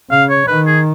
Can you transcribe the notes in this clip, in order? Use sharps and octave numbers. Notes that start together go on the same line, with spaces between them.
C#3 F5
C#5
D#3 B4
G#4